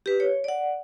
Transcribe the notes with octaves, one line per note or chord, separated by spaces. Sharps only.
G4 B4
C#5
D5 F#5